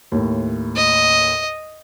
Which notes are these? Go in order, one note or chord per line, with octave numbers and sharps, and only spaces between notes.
D#2 A2
D#5